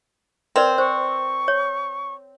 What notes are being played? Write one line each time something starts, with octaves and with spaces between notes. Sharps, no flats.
C4 A#4 B4 D5
C5 C#6
C#5